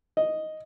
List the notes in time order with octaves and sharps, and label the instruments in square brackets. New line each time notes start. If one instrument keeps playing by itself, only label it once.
[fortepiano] D#5